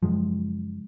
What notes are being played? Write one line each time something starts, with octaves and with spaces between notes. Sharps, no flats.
F#2 C#3 F3 G#3